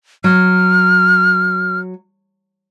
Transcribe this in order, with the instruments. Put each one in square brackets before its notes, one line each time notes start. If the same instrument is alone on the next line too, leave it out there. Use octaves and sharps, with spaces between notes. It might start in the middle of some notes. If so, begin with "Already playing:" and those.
[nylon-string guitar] F#3 [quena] F6